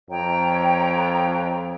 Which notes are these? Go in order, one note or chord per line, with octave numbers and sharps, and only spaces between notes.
F2 C#5 G5 A#5